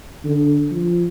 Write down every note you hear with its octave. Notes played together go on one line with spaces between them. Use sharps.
D3
F3